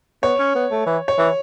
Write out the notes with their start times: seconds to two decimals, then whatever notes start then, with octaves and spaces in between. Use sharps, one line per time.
0.23 B3 C#5
0.39 C#4
0.55 B3
0.71 A3
0.86 E3
1.08 C#5
1.18 E3